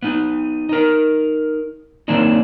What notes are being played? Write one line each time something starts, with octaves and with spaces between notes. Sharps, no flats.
B3 D#4
D#4 A#4
D#3 F#3 A#3 C4 D4 D#4